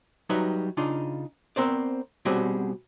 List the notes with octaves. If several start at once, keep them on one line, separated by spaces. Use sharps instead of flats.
F#3 G3 D#4 B4 E5
C#3 D4 D#4 F4
B3 C4 A#4 C5 D5
B2 G3 C4 C#4 F#4 G#4